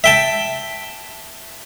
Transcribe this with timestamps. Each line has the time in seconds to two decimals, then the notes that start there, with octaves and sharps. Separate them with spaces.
0.04 E5 G5 A5